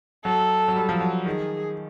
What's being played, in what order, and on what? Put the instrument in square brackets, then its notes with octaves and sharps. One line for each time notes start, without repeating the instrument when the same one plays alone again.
[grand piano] F#3 [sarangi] A4
[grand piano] F#3
G3
F3
F#3
[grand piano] D#3 [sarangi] G#4